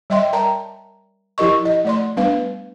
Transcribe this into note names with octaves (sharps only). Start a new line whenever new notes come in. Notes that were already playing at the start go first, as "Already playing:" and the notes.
G3 C#5 D#5 E5 G5 C6
A#4 D5 G5 A5 A#5
F3 E4 G4 A#4 D#5 C#6
D#5
A3 D5 C6
G3 B3 D4 B4 F5